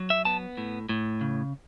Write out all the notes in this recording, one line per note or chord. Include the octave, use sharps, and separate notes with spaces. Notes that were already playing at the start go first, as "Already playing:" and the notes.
Already playing: F#3
E5
B3 A5
A2
A2
C#3